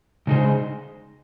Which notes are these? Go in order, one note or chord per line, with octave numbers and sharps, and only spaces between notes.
C#3 G#3 D#4 G#4 C5